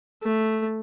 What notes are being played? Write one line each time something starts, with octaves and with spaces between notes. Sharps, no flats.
A3